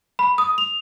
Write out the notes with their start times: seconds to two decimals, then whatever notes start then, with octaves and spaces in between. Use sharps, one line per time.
0.19 B5
0.38 D#6
0.58 F7